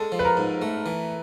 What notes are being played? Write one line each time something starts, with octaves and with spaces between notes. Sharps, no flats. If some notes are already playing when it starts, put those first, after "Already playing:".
Already playing: G#3 A4
F3
B4
A#4
G#2
A3
E3